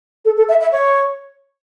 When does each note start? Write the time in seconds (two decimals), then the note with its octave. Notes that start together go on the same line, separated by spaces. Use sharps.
0.25 A4
0.37 A4
0.49 E5
0.61 E5
0.72 C#5